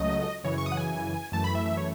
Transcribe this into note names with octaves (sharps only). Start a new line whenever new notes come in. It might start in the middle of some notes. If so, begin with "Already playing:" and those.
Already playing: C#2 C#3 F#3 A3 D#5
F#2 C#3 E3 C#5
C#6
D#6
F#5
G#5
F#2 E3 A3 A5
B5
E5
E5
C#5